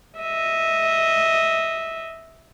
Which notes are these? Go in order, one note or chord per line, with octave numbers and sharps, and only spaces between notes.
D#5 E5